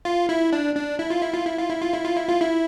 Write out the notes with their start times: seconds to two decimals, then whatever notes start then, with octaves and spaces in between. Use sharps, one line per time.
0.05 F4
0.29 E4
0.53 D4
0.75 D4
0.99 E4
1.10 F4
1.22 E4
1.34 F4
1.46 E4
1.58 F4
1.70 E4
1.82 F4
1.93 E4
2.05 F4
2.17 E4
2.28 F4
2.41 E4